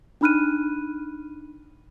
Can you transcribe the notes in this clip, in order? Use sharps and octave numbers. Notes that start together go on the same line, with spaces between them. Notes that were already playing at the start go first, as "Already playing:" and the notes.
D4 D#4 B5 F6 F#6 D#7